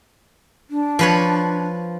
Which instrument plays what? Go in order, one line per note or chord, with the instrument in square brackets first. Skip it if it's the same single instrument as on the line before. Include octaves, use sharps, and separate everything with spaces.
[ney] D4
[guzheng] F3 B4 C#5